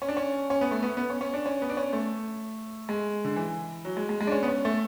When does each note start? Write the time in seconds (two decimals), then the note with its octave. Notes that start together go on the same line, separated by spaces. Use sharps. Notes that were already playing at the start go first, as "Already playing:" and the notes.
0.02 C#4
0.09 D4
0.17 C#4
0.50 C#4
0.61 B3
0.71 A3
0.83 B3
0.97 B3
1.10 C#4
1.21 C#4
1.34 D4
1.46 C#4
1.62 B3
1.70 D4
1.77 C#4
1.93 A3
2.89 G#3
3.25 D3
3.36 E3
3.85 F#3
3.97 G#3
4.09 G#3
4.21 G#3
4.27 D4
4.32 C#4
4.43 B3
4.48 C#4
4.65 A3